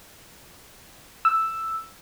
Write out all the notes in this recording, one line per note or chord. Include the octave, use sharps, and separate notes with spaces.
E6